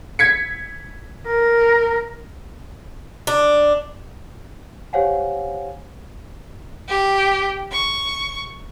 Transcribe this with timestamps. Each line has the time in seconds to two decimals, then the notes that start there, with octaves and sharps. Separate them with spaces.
0.19 G#6 B6 C#7
1.27 A#4
3.27 D4
4.93 G4 C5 C#5 F5 F#5 G#5
6.89 G4
7.72 C#6